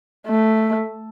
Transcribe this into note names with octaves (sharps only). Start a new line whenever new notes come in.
A3